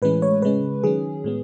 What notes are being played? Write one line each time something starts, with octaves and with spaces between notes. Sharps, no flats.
A2 E3 G#3 C#4 B4
C#5
C#3 G#3 C#4 B4
D#3 F#3 C#4 G#4
A2 G#3 B3